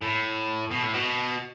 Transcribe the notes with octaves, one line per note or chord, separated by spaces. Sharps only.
A2
B2
A2
B2